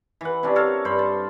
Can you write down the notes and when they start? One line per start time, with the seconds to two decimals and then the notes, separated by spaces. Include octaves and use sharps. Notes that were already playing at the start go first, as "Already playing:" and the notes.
0.21 E3 F#5
0.43 C3 C#4 D4
0.56 A4 A#4 C#5 F5
0.85 G2 C5 B5
0.99 A5